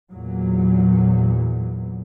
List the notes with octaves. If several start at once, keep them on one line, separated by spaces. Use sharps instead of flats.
E2 A#2 F#3